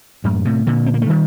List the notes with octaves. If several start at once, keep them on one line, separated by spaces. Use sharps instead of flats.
F#2 A2
A2 C3
A#2 D3
C4
A#3
A3
D#3 G3